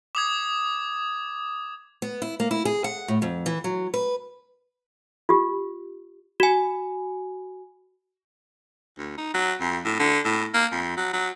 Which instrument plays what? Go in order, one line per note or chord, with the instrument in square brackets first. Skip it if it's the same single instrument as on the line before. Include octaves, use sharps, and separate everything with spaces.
[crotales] D6 D#6 G#6
[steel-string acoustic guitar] B3
E4
A#3
E4
G#4
F#5
A2
F2
E3
F#3
B4
[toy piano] F4 G4
[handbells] F#4 G#5
[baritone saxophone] D2
D#4
F#3
F2
A2
D3
A2
A#3
F2
F#3
F#3